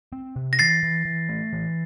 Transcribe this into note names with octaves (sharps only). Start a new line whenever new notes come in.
C4
C3
A#6
E3 A6 C7
E3
E3
A3
E3